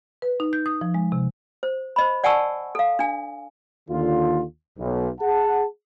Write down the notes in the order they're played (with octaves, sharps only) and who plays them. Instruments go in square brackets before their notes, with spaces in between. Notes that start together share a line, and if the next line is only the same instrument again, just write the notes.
[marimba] B4
D#4
G6
D#6
F3
G#3
C3
[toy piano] C5
C5 D#5 B5
D5 F#5 G#5 A5 C#6 E6
A4 F5
D4 G#5
[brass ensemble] D#2 D3 F4
B1
G#4 F#5 A5